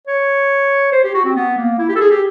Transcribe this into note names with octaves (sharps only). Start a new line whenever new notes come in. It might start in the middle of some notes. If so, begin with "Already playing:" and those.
C#5
C5
G4
F#4
C4
B3
A#3
E4
G4
A4
G#4
G4